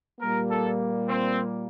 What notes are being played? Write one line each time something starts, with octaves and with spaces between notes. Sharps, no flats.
A#2 G3 A#3 A#4
A4
C4